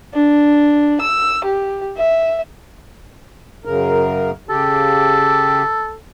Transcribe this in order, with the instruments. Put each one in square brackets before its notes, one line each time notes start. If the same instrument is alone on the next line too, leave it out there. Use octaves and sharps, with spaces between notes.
[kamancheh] D4
E6
G4
E5
[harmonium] F#2 C#3 A#4
[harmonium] C#3 G4 [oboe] A4